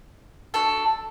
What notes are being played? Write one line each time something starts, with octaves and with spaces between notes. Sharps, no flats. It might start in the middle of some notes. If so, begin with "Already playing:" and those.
D4 F#4 A4